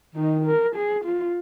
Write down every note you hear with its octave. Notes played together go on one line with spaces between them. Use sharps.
D#3 D#4
A#4
G#4
F4